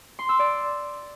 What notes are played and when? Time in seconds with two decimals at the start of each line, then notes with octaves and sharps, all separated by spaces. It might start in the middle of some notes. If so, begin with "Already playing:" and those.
0.19 C6
0.29 E6
0.39 D5